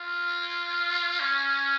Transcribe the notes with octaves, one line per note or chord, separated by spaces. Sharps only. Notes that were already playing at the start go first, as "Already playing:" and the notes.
Already playing: F4
C#4